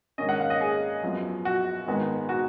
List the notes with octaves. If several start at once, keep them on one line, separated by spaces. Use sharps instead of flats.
G#2 D#3 A#3 C#4 D#5
F#5
F5
D#5
G#4
F#2 F3 B3
F#4
G#2 D#3 G#3 B3
F#4